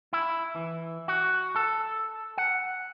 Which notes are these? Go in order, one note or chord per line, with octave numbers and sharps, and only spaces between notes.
E4
E3
F#4
A4
F#5